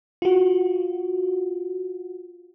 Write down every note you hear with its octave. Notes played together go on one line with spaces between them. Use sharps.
F4 F#4